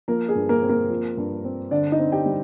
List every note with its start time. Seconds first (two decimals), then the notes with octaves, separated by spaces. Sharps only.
0.08 F3 A#3 A#4
0.29 G#4
0.35 G2
0.49 A#3 A#4
0.62 C4
0.69 A#3 A#4
0.90 F3
1.17 G2
1.44 C4
1.71 D3 D4 D5
1.92 D#4 D#5
1.99 C4
2.12 G4 G5
2.26 G3